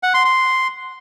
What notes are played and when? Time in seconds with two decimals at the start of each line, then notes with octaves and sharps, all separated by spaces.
0.03 F#5
0.14 C6
0.25 C6